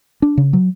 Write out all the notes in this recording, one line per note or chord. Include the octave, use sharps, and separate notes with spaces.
D4
C#3
F#3